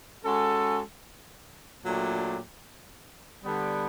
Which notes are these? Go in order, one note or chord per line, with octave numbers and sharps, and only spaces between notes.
G#3 C#4 F#4 A4
A#2 F#3 A3 D4 G4
D3 G3 B3